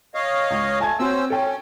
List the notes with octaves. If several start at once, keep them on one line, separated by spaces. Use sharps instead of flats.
C#5 D#5 F5
C#2
A3 G#5 A5 G#6
C4 C#4 F#4 C5 E6
C#4 A4 G5